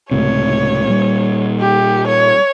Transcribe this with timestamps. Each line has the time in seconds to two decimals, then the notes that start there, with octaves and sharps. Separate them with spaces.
0.11 C#2 A2 C3 C#5
0.87 A#2 G3
1.60 G4
2.07 C#5